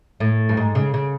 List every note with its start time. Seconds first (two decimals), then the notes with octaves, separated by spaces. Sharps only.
0.20 A2
0.49 G2
0.57 G#2
0.75 C#3
0.94 C#3